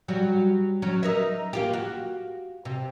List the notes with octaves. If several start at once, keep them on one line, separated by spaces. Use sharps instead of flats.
F#3 G3 F#4
F#3 C#4
D#4 A#4 E5
A#3 F4 G4
F#4
C3